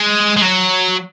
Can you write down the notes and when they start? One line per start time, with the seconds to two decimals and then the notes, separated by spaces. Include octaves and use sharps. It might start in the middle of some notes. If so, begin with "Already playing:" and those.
Already playing: G#3
0.37 G#3
0.42 F#3